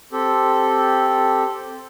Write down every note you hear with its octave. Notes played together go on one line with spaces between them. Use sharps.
C4 G4 A4